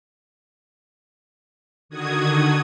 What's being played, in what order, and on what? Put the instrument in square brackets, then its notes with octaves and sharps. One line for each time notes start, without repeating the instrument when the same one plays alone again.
[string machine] D3 D#3 F#4 D#6 G#6